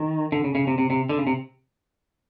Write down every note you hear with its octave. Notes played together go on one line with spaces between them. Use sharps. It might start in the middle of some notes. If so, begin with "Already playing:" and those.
Already playing: D#3
D3
C#3
C#3
C3
C3
C3
D3
C#3
C3